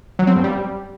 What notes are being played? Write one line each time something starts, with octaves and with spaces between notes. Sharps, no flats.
F#3
C4
G2
G3